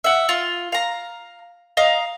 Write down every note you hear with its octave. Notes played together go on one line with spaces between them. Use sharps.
E5 F#5
F4
F5 A#5
D#5 F5 A#5